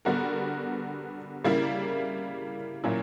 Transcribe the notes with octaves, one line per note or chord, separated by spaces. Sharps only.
D3 G3 B3 F#4 A#4
C#3 G3 A#3 E4
A#2 F#3 A#3 C#4 E4